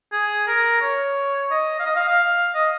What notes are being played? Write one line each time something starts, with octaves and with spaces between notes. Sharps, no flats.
G#4
A#4
C#5
D#5
F5
D#5
F5
F5
D#5